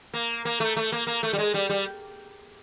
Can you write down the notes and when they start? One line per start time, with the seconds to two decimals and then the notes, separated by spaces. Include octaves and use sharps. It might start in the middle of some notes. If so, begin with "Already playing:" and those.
0.14 A#3
0.45 A#3
0.60 A3
0.77 A3
0.92 A#3
1.07 A#3
1.23 A3
1.33 G3
1.38 G#3
1.54 G3
1.69 G3